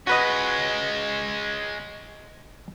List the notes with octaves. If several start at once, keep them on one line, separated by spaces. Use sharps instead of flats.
G#3 C#4 F#4 B4 D#5